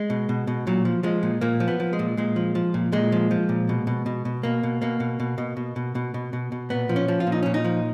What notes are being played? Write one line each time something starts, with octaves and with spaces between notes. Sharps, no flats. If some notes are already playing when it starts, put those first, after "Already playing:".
Already playing: G#3
B2
B2
B2
A#2 F#3
F3
F3 G#3
A#2
A#2 A#3
F3
B3
F3
G#3
A#2
A#2 G#3
F3
F3
A#2
A#2 G#3
F3
F3
A#2
B2
B2
B2
B2
B2 A#3
B2
B2 A#3
B2
B2
B2
B2
B2
B2
B2
B2
B2
A#2 B3
F3
C#4
F3
F4
A#2
D#4
A#2 C#4
D#4
F3